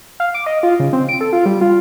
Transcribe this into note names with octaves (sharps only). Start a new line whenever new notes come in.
F5
D6
D#5
F4
C#3
C4
D7
A4
F4
G3
F4